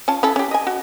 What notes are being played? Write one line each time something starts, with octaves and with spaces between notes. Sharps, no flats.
C#4 F4 A5
C#4 E4 A4
C#4 G4
D#5 G#5
F#4